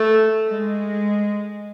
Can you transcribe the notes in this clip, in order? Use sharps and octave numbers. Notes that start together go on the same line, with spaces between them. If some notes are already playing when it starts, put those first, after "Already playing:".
Already playing: A3
G#3